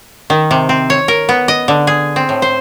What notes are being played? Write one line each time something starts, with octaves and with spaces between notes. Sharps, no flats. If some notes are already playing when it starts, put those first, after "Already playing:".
D#3
C3
C4
C#5
A#4
B3
D#5
D3
G#4
C4
A2
C5